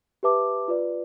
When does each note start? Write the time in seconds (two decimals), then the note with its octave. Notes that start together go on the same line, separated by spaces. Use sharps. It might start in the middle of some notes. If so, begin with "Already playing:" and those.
0.23 G4 B4 E5 A5 D6
0.68 F4 B4 D5